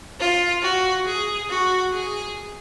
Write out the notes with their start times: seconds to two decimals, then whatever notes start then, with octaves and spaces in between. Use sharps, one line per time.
0.19 F4
0.62 F#4
1.06 G#4
1.50 F#4
1.93 G#4